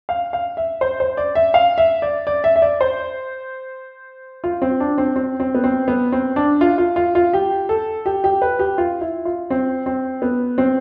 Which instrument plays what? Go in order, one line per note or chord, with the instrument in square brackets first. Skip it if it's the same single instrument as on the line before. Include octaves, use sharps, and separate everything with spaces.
[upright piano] F5
F5
E5
C5
C5
D5
E5
F5
E5
D5
D5
E5
E5
D5
C5
F4
C4
D4
C4
C4
C4
B3
C4
B3
C4
D4
F4
F4
F4
F4
G4
A4
G4
G4
B4
G4
F4
E4
F4
C4
C4
B3
C4